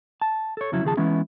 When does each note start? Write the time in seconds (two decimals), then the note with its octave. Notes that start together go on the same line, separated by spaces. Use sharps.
0.22 A5
0.57 A4 C#5
0.72 F2 C#3 F#3 C#4 E4
0.83 D#2 C#3 F3 G#4 A5
0.97 E3 G#3 B3 C#4 E4